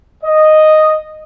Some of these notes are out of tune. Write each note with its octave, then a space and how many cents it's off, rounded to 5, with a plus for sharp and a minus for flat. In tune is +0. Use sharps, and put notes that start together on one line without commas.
D#5 -5